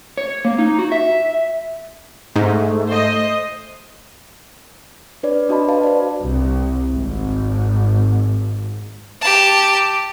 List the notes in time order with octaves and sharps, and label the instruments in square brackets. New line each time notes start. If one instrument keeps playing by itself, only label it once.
[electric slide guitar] C#5
A#3
D#4
F#4
E5
[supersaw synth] G#2 [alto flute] A3
[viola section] C5 D#5
[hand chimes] D4 B4 C#5 D5
D4 F#4 D#5 A5 B5
F#4 B4 F5 A5
B4 C5 D5
[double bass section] C2
G#1
[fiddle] G4 A5